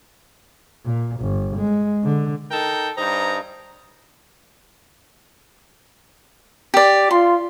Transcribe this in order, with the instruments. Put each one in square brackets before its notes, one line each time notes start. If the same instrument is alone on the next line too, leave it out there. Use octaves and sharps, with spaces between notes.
[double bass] A#2
G1
G#3
D3
[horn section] D#4 A4 A#4 G5
G2 D#4 C5 A#5
[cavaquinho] G4 D5
[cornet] F4 [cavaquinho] C6